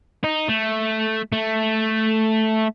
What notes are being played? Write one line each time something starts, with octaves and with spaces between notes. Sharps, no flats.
D#4
A3
A3